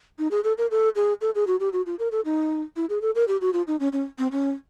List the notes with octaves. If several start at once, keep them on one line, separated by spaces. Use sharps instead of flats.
D#4
G#4
A4
A#4
A4
G#4
A4
G#4
F#4
G4
F#4
F4
A#4
A4
D#4
E4
G#4
A4
A#4
G4
F#4
F4
D#4
C#4
C#4
C4
C#4